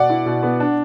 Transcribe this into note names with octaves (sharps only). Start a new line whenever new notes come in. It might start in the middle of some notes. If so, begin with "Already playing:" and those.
Already playing: B2 D5 F#5
E4
B2
B3
D4